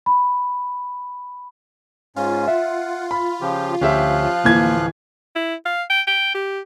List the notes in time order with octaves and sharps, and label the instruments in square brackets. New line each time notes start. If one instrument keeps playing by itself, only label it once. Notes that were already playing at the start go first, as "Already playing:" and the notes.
[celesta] B5
[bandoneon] G#2 C#4 [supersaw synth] F4
[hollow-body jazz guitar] E5 [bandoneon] F#5
[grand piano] B5
[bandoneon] C#3 F3 G4
[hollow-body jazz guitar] D2 [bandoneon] F3 F5 F#6 [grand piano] C#4 G4 E5
[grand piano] D1 E3 G#6 [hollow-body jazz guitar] A#3
[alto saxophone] E4
F5
G5
G5
G4